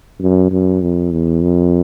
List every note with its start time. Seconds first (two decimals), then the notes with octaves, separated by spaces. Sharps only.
0.21 F#2
0.51 F#2
0.82 F2
1.12 E2
1.43 F2